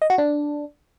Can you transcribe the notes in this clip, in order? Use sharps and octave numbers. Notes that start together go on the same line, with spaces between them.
D#5
F#4
D4